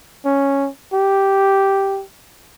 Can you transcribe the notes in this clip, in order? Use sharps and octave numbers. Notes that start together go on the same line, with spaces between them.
C#4
G4